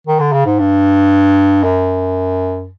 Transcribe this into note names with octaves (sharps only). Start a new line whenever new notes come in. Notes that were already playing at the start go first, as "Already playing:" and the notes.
D#3
D3
C#3
G#2
G2
F#2